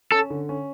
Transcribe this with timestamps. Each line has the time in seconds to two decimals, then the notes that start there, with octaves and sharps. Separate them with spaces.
0.12 C#4 A4
0.30 D3
0.49 C#4